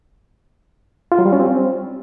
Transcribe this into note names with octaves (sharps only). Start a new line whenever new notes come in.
F4
F#3
G3
C#4
C4